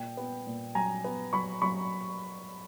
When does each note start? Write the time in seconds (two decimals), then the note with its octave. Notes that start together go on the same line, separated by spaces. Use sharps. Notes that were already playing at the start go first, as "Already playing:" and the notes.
Already playing: A#2 G5
0.17 B3
0.47 A#2
0.75 F#3 G#5 A#5
1.04 B3
1.33 F#3 B5 C#6
1.62 F#3 B5 C#6